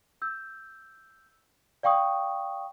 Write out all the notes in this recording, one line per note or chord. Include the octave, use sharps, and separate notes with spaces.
E6 G6
D5 F5 G5 C#6 D#6